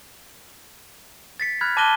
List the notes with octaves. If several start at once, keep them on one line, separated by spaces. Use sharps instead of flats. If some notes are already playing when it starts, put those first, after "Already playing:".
A6 B6 C#7
B5 F6 F#6 G#6
A5 D6 F#6 A#6 D#7 G7